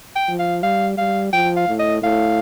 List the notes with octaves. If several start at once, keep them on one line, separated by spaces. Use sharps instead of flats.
G5
F3
F5
G3 F5
G3 F5
F3 G5
F5
A2
D#5
A2 F5